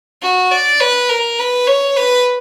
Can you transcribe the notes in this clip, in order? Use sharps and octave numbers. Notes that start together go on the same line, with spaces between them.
F#4
D5
B4
A#4
B4
C#5
B4